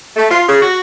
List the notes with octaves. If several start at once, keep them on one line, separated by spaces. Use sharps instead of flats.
A3
F4
C#3
F#4